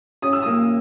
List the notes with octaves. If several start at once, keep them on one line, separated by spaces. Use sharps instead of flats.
C#4 D#6
E6
A#3 D#6